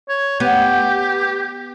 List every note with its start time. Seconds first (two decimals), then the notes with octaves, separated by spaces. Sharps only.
0.09 C#5
0.40 B3 G4